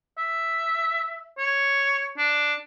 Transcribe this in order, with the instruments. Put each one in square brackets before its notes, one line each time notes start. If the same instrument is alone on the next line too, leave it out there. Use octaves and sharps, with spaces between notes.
[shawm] E5
C#5
D4